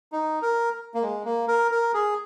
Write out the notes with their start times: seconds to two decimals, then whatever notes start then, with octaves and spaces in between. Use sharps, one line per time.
0.12 D#4
0.42 A#4
0.94 A#3
1.02 G#3
1.25 A#3
1.48 A#4
1.71 A#4
1.94 G#4